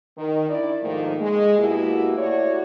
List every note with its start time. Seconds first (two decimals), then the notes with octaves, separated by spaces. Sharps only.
0.17 D#3
0.49 D4 E4 D5
0.82 G#2 D#3 F3 A3 A#3
1.20 G#3
1.58 B2 A#3 E4 F#4 G4
2.18 A3 E4 F#4 C#5 D5